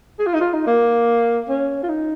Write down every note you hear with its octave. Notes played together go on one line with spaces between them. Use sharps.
G#4
F4
D#4
F4
D#4
A#3
C#4
F4
D#4